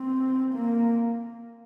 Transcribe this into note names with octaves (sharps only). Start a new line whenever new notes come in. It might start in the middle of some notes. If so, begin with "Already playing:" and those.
Already playing: C4
A#3